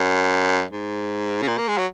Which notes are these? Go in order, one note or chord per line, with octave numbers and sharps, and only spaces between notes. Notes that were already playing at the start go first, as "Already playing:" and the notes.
Already playing: F#2
G#2
C#3
A#2
A#3
G#3
F#3